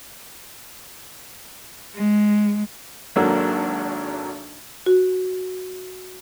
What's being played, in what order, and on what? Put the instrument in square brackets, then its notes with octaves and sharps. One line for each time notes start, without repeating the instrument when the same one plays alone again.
[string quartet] G#3
[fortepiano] G#1 F#3 A#3 D4 A4 E6
[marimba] F#4